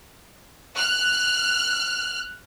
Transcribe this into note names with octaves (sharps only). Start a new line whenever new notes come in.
F6 F#6